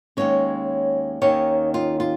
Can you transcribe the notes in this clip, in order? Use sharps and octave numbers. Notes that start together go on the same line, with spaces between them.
D#2 C#3 G#3 C#4 C#5
D#2 D#3 C#4 C#5
F4
F4